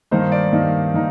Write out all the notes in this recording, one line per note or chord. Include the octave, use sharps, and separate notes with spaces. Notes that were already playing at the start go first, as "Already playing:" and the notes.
G2 D#3 A#3 D#4 C5
D5
G2 D#3 A#3 D#4
D#3 A#3 D#4